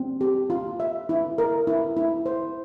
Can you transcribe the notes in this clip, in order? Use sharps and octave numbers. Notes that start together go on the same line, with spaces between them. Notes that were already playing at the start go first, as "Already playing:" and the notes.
Already playing: C4
G4
F4
E5
E4
A#4
E4
E4
C5